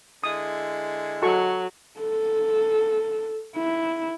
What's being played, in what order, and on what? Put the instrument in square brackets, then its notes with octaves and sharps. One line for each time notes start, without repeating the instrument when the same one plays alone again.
[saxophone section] D3 G#3 E4 [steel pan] D#6
[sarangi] F#3 [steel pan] F#4 A4 C#6
[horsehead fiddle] A4
E4